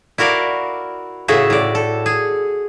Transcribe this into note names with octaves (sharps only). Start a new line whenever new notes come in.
E4 F#4 A#4 D5 F5
A2 C#3 F#4 G#4 E5
A2 D5
A4
G#4